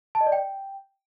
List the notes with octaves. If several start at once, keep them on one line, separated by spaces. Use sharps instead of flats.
A5
D#5
D5
G5